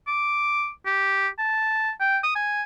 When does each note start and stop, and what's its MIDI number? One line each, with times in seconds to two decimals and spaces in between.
0.08 0.70 86
0.86 1.28 67
1.39 1.91 81
2.00 2.18 79
2.24 2.32 87
2.36 2.63 80